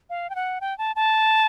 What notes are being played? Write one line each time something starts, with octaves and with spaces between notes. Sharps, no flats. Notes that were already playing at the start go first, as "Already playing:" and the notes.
F5
G5
F#5
G5
A5
A5